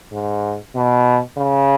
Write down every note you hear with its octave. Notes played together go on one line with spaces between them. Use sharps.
G#2
B2
C#3